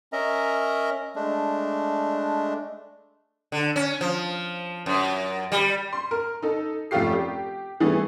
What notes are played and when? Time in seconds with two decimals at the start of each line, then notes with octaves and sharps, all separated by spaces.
0.13 C#4 A#4 D#5 E5 A#5
1.16 G#3 A3 D4
3.52 D3
3.76 C#4
4.01 F3
4.86 F#2
5.52 G3
5.93 C6
6.11 A#4
6.42 D#4 A4
6.91 F1 A3 C#4 F4 G4 C7
7.13 G4
7.80 E3 G3 A3 B3 G#4